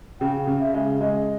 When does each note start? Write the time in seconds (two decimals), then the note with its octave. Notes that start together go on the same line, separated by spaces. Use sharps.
0.21 C#3 G5
0.47 C#3
0.61 E5
0.74 G#3
1.00 G#3 D#5